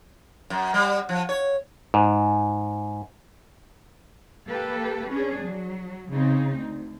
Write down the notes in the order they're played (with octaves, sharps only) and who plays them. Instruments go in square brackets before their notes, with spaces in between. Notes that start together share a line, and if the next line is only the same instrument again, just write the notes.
[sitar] F#2
G3
F3
C#5
[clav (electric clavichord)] G#2
[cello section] A#3 G4 A4 B4
C#4 D4 G#4
F#3
C#3 C4 D#4
D2